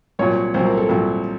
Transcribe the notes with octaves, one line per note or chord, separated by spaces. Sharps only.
C2 A#2 F#3 C#5
C2 A#2 F#3 C5
A#4
A4
C2 A#2 F#3